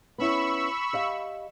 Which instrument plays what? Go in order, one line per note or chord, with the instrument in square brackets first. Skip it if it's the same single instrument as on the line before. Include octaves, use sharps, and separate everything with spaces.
[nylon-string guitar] B3 C#4 E4 [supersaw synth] B5 C#6 E6
[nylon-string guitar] G4 D#5 F5